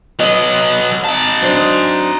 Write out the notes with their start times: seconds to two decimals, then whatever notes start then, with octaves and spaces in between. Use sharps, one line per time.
0.20 F#3 B3 D#5
1.04 D#4 A5
1.42 F#3 D4 C5